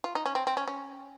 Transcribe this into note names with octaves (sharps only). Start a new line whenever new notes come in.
F4
D#4
C#4
C4
C4
C#4
C#4